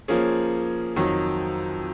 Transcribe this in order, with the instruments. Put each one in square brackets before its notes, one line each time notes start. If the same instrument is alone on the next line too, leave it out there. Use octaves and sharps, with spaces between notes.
[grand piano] F3 A#3 C#4 G#4
F2 D#3 F#3